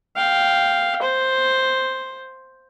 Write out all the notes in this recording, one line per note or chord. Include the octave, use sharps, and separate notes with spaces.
F5 G5
C5